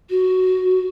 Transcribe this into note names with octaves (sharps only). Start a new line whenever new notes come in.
F#4